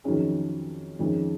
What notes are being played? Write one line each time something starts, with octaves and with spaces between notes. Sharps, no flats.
F2 D#3 F#3 C#4 G#4
F2 D#3 G#3 C#4